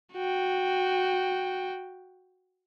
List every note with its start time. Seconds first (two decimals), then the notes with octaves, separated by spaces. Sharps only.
0.14 F#4 G5